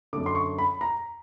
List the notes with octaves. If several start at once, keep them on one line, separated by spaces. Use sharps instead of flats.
F#2 D3 D6
C6
C#6
B5
A#5